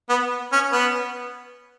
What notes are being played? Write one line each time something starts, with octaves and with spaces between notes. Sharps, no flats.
B3
C#4
B3